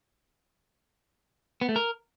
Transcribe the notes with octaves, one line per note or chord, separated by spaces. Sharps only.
B3
A3
A#4